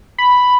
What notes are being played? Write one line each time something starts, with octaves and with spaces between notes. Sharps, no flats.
B5